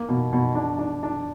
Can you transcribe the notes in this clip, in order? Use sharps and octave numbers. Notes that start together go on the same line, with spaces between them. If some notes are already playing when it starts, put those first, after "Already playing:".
Already playing: A#3
B2
B2
D4
D4
D4